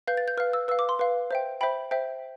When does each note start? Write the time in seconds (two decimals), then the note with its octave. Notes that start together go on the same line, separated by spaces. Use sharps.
0.07 B4 F5 G6
0.17 A6
0.28 G6
0.37 B4 F5 F6
0.53 E6
0.68 B4 E6
0.71 F5
0.79 D6
0.89 C6
0.99 B4 F5
1.31 C5 E5 G5
1.61 C5 E5 G5 B5
1.91 C5 E5 G5